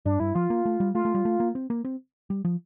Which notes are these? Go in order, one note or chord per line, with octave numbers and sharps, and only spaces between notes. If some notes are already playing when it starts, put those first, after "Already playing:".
G2 D4
G2 E4
F3 F4
A#3
A3
G3
A3 F4
A3
G3
A3
A#3
C4
A#3
C4
G3
F3